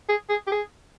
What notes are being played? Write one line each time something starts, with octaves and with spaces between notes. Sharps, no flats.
G#4
G#4
G4
G#4